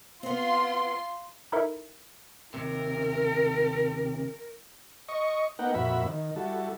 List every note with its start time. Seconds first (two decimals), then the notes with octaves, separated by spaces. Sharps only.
0.23 B3 C4 F4 C6
1.52 D#4 E4 A4 A#4 E5
2.54 D#2 C3 A#4
5.08 D#5 C#6
5.59 A#3 B3 D#4 F#5 G5
5.74 F2 A#2 F#4 E5 B5
6.06 D#3
6.36 G3 E4 F#4 A4